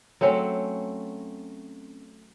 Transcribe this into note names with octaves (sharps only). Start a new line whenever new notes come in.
F#3 A3 C4 C#4